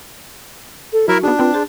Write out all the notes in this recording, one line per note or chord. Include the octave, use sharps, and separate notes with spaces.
A4
F#3 E4 F#4 A#4 E5 C#6
B3 D4 D#4 G#4
C4 F4 B4 G5
G#4 C5 A6